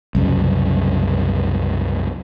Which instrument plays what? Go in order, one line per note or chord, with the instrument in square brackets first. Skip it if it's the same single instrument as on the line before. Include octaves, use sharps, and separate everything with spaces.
[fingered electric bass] C2 F#2 C#3